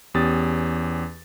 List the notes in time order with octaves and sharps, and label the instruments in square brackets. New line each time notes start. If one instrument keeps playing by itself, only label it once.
[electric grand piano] E2 C#4 G4 D#6 A6